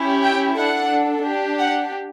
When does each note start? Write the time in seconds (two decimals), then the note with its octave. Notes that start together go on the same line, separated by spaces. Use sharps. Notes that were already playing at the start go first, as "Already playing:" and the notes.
Already playing: C#4 E4 G4
0.23 G5
0.57 D4 A4 F#5
1.25 D4 G4
1.59 F#5